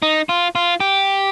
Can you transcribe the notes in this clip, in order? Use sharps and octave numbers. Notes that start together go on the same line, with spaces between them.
D#4
F4
F4
G4